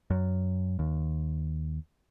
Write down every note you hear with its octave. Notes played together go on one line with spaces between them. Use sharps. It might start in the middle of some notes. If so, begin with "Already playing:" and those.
F#2
D#2